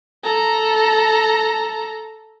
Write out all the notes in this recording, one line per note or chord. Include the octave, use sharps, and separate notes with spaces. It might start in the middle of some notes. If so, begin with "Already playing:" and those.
A4 A#5